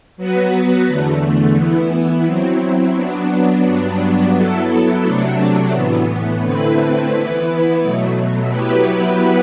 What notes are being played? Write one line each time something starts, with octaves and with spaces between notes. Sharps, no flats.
F#3 B3 F#4 B4
E2 D3 A3
E3 B3 E4
F#3 C4 E4
F#3 B3 D4
G2 F#3 B3 D4
F#3 B3 E4 A4
C3 F#3 A3 D4
A2 E3 B3
D3 A3 C4 E4 B4
E3 B3 E4 B4
B2 F#3 A3
F#3 B3 E4 G4 B4